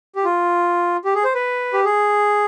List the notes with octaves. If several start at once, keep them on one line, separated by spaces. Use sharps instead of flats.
G4
F4
G4
G#4
C5
B4
G4
G#4